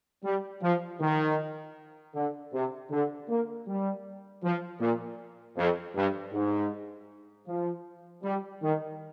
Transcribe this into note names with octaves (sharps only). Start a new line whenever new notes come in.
G3
F3
D#3
D3
C3
D3
A#3
G3
F3
A#2
F2
G2
G#2
F3
G3
D#3